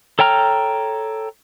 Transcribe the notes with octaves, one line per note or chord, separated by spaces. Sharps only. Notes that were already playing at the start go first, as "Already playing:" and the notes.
A4 C#5 G5 A#5 F6